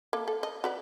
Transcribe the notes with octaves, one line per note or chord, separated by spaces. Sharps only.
A#3 A4
A4
D#5
F#4 B4 D5